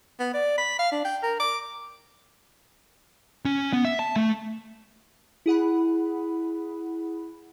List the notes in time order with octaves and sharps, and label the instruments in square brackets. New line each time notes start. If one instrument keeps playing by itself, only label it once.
[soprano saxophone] B3
D5
B5
F5
D4
G5
A#4
D6
[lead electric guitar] C#4
B3
E5
A5
A3
[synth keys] E4 G#4 F#5 B5